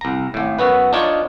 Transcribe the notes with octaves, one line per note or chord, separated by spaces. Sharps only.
C2 A#5
G#1 A2
F#2 B3 F#4 B4
D4 D#4 F4 C#5